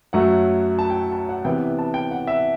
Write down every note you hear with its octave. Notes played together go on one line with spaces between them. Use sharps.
F#2 F#3 A3 F#5
A5
G5
A5
F#5
C3 E3 B3 G5
A5
G5
F#5
E5